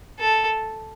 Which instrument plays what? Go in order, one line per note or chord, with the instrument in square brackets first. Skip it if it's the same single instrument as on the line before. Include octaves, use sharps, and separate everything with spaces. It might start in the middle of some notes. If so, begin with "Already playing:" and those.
[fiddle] A4